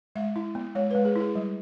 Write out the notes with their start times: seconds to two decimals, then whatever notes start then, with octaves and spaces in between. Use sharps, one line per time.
0.15 G#3 E5
0.36 E4
0.55 B3
0.75 G#3 C#5
0.91 G#3 B4
1.05 G#4
1.16 E4 G#4
1.35 G3